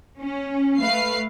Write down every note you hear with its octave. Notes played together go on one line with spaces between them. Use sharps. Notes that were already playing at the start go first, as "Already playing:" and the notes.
C#4
A3 B4 F5 C7